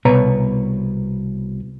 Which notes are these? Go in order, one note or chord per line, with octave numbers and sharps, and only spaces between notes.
C2 B2 B4 C#5 A#5